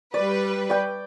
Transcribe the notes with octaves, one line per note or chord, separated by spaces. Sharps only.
G3 B4 D5
D5 G5